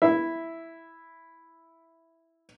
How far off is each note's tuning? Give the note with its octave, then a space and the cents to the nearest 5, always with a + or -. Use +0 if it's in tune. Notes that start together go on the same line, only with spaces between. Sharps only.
E4 +0 E5 +0